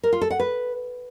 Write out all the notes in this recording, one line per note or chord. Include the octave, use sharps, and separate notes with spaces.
A#4
F4
A4
F#5
B4